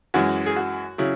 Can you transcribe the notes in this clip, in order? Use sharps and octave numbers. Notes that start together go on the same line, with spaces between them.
F#2 E3 G#3 F#4
G#4
F#4
C#3 F#3 E4